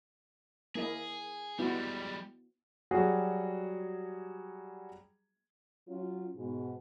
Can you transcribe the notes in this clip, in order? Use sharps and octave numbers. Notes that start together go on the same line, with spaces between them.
A#3 E4 G#4 D#5
G3 G#3 B3 E4 F#4
F#3 G3 F#4 G#4
F#3 C#4 F4
G#2 B2